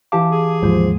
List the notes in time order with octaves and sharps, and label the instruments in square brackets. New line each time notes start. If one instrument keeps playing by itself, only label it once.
[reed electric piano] E3 G4 D6 [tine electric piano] F5 A5
[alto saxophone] G#4
[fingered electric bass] D#2 G#2 [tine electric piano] F3 C5